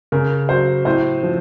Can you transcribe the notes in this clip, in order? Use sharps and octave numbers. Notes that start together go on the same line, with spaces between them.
C#3 A#4
F#3 C5
A2 C5
F3